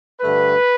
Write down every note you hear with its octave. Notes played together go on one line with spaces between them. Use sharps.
G2 D3 A3 B4